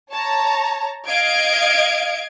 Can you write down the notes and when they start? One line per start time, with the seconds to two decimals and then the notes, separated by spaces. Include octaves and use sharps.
0.11 C#5 A5 A#5
1.07 D#5 F5 G#6 D7